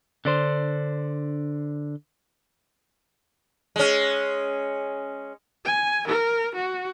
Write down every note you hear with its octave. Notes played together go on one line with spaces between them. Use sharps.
D3 D4 C5
G#3 C#4
G#5
A#4
F#4